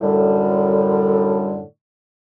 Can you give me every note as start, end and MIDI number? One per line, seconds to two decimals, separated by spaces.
0.01 1.60 42
0.01 1.60 45
0.01 1.60 50
0.01 1.60 55